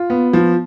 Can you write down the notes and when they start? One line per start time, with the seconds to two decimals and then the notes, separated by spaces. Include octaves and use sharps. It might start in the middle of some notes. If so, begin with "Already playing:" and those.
Already playing: F4
0.10 B3
0.33 F3